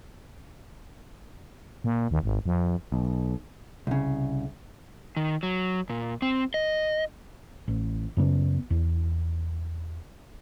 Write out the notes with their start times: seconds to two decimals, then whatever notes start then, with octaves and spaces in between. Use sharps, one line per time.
1.84 A#2
2.11 D#2
2.24 G#1
2.46 F2
2.92 B1
3.87 C2 C#3
5.17 D#3
5.43 F#3
5.90 A#2
6.22 C4
6.54 D#5
7.68 A1
8.17 F#2 C#3 B3
8.70 E2